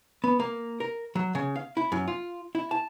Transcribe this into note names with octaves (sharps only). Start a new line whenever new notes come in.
B3
A#3
A#4
F#3
C#3
F5
E4
F#2
F4
E4
A5